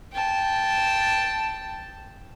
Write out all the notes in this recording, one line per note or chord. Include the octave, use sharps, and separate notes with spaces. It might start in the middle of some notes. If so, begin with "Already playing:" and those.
G5 A5